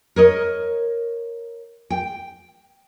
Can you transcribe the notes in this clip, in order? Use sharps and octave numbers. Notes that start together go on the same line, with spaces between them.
A#4 C#5 D#5
G5